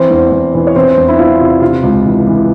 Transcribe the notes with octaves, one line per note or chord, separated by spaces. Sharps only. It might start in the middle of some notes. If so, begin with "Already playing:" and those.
Already playing: E3 C4 C5
E2
E2
E3
C#5
E3 C4 C5
E2
E4
E2 F4
C3
C3 F4
C#2
E3
E3